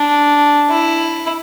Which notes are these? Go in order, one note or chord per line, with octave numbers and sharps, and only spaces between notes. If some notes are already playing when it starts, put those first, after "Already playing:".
Already playing: D4
E4